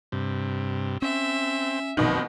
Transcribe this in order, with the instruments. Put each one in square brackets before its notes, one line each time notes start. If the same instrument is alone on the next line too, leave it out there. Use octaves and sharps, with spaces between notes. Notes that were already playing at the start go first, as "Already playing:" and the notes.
[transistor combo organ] G2 C3
[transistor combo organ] C4 [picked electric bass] C#4 [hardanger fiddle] E5
[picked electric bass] F1 A#1 F#2 [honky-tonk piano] B2 D#3 [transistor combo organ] C4